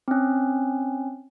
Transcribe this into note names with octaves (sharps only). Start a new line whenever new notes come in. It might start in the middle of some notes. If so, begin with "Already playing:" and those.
C4 C#4